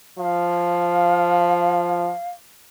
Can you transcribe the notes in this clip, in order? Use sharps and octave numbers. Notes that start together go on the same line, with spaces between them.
F3 F5